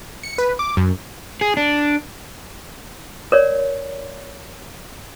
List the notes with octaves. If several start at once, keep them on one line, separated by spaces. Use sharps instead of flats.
C#7
B4
D6
F#2
G#4
D4
A#4 C#5 D5